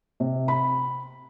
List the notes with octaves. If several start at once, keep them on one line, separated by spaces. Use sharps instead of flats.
C3
B5